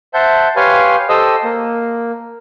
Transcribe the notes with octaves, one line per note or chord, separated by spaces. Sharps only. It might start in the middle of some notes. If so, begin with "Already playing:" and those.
C5 E5 F#5 A5 G6
G4 B4 C#5 F5 G#5 C6
G4 A4 C5 D#5 D#6 E6
A#3